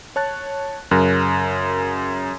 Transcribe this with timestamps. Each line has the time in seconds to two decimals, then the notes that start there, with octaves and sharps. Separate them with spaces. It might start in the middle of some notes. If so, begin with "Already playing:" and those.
0.16 C#5 A5 F#6 A6
0.91 F#2 C#3 A#4 F#6